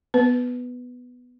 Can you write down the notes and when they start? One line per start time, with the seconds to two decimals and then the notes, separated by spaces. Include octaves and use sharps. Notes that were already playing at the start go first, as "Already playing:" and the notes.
0.14 B3 B4